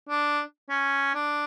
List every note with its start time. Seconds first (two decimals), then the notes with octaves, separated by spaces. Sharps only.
0.09 D4
0.69 C#4
1.15 D4